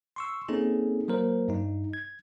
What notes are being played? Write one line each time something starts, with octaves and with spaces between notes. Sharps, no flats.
C6 C#6 E6
A#3 C4 C#4 D#4 G#4 A4
F#3 A#3 A#4 C5
G2 D#4
G#6